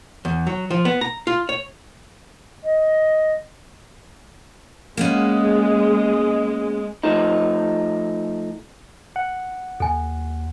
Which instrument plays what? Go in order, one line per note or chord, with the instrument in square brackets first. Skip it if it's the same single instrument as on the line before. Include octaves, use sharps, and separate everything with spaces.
[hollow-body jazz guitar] E2
F#3
F3
B3
A#5
F4
C#5
[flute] D#5
[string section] G#3 [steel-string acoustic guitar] A#3 B3 C#4
[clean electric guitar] F3 A3 D#4
[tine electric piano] F#5
[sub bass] D#2 [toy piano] A4 G#5